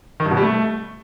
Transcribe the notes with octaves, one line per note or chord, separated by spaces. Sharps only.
D#3
G2
B2
G3
A3